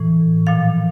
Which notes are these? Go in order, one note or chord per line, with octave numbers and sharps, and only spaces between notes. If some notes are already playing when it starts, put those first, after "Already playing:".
Already playing: A2 E3
A#2 F3 F5